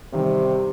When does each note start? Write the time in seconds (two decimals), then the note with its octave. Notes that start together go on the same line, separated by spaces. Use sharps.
0.12 C3 D#3 G3